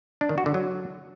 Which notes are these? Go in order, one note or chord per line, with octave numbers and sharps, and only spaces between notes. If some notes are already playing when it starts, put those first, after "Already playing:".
D4
D#3
F#4
D3
F#3